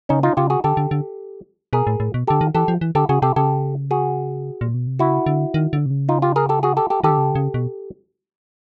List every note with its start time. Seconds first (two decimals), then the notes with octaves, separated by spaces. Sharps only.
0.09 C#3 C#4 D#4
0.23 D#4 F4
0.37 C#3 F4 G4
0.50 F#4 G#4
0.64 D3 G4 A4
0.77 D3
0.91 D3
1.73 B2 G#4 A#4
1.87 A2
2.00 A2
2.14 B2
2.27 D3 G4 A4
2.41 D#3
2.55 E3 G4 A4
2.68 F3
2.81 E3
2.95 D3 G4 A4
3.09 C#3 F#4 G#4
3.22 C3 G4 A4
3.36 C#3 G4 A4
3.91 F#4 G#4
4.61 A#2
4.74 B2
4.87 C3
4.99 C#3 E4 F#4
5.26 D3
5.54 D#3
5.73 D3
5.86 C3
5.90 C#3
6.09 D#4 F4
6.22 F4 G4
6.36 G#4 A#4
6.49 G4 A4
6.63 F#4 G#4
6.77 G4 A4
6.90 G4 A4
7.03 D#3 G4 A4
7.10 D3
7.18 C#3
7.31 D3
7.35 C#3
7.54 B2